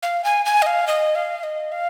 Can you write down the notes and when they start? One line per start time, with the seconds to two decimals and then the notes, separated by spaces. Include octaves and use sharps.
0.03 F5
0.24 G#5
0.46 G#5
0.62 D#5
0.66 F5
0.87 D#5
1.15 F5
1.43 D#5
1.72 F5